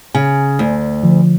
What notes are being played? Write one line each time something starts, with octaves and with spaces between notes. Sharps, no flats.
C#3 G#5
D2
D3 F3